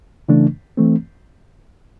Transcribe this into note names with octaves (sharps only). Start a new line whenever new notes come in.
C#3 E3 A3 D4
E3 A3 C4